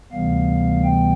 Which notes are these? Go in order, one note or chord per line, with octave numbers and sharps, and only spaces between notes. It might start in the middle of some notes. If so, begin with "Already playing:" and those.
D2 C3 E3 G3 B3 F5
G5